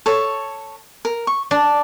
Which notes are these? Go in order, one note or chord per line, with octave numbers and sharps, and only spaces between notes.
A4 C#5
A#4
C#6
D4 D5